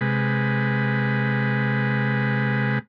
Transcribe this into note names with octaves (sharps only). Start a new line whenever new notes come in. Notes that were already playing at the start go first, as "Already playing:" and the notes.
C3 G#3 B4